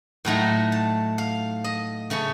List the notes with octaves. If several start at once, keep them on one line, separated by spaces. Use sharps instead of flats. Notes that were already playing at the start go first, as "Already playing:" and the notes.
A2 F#3 A3 D#4 A#5
A5
F5
D#5
C#3 A3 C#4